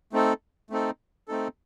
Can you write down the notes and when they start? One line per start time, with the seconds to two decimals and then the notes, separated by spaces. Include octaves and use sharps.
0.13 A3 C4 D#4 A4
0.70 A3 C4 D#4 A4
1.28 A3 C4 D#4 A4